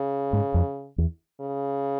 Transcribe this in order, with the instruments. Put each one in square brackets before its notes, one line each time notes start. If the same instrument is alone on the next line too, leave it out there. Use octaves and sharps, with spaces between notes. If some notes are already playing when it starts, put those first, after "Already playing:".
Already playing: [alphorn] C#3
[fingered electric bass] G#2
F2
E2
[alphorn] C#3